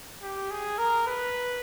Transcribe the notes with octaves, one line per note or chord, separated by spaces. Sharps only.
G4
G#4
A#4
B4